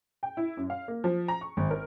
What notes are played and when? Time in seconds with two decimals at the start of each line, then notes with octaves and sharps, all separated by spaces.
0.23 G5
0.37 E4
0.57 F#2
0.70 F5
0.88 A#3
1.04 F3
1.28 A#5
1.41 C#6
1.57 G#1
1.71 A#4